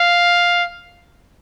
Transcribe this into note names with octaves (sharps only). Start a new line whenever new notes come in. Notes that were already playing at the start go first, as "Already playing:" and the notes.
Already playing: F5